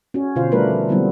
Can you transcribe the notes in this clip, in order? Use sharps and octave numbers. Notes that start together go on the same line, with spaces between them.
C#4 F#4
B2 D3 F4 C5 F5
D#3 G3 A3 D4 A#4 B4
F3
D3 F#3 G3 B3 C4 E4